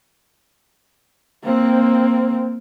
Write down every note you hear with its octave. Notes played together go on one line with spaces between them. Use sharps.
A#3 C4